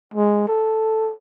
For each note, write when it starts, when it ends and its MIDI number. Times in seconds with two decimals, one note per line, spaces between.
0.14 0.44 56
0.48 1.13 69